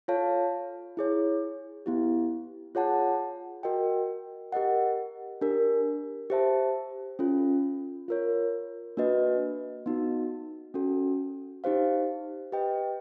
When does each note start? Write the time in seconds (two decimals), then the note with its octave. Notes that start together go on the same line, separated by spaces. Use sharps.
0.08 F4 A4 C#5 F5 A5
0.97 E4 G#4 C#5
1.86 B3 E4 G4
2.75 F4 G#4 C#5 F#5 A5
3.63 F#4 A#4 D#5 G5
4.52 G4 A#4 D#5 F#5
5.41 D4 G4 A#4
6.30 G4 C5 E5 A5
7.19 C#4 F4 A4
8.08 F4 A#4 C#5
8.97 A#3 D4 F#4 B4 D#5
9.86 B3 D#4 F#4
10.74 C#4 F#4 A4
11.64 D#4 G4 C5 F5
12.52 G4 B4 D#5 G5